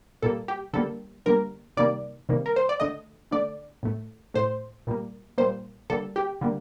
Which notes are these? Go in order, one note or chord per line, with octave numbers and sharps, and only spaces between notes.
A#2 G3 A#3 A4
G4
D3 G3 A#3 A4
D3 G3 A#3 A#4
C3 D#3 G3 A#3 D5
C3 D#3 G3 A#3
A#4
C5
D5
D3 A3 D#5
D3 A3 D5
A2 A3
A2 A3 C5
A#2 G3 A#3
A#2 G3 A#3 C5
D3 G3 A#3 A4
G4
D3 G3 A#3